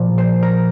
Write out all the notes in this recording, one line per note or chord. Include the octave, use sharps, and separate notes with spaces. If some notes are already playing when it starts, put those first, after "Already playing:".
Already playing: A#2 F3
C5
A#4